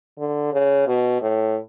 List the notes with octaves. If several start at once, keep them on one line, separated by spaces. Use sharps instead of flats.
D3
C#3
B2
A2